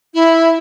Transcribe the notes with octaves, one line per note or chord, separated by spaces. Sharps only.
E4